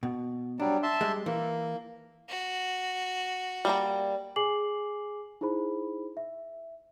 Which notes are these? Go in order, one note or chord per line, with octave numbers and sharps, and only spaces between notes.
B2
F#3 G3 D4
E5 A5 C6
G3 G#3
E3 A#3
F#4
G3 A#3 A#5
G#4 G#5 D6 C7 F#7
D#4 E4 G#4 C5 B5
E5